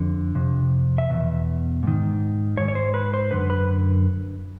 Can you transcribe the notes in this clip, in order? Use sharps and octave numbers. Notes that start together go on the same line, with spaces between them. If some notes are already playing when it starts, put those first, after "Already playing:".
Already playing: F2 D3
F2 C3
E5
E2 B2
G#2 D#3
G#2 D#3 C#5
C#5
C5
B4
C5
F#2 D3 B4
B4